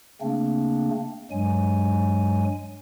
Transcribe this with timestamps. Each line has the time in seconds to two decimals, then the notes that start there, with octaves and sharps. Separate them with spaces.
0.21 C#3 A3 A#3 C4 D4
1.31 G2 F#3 G#3 G#5